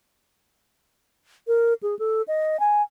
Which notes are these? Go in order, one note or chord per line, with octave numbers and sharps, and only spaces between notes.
A#4
G#4
A4
D#5
G#5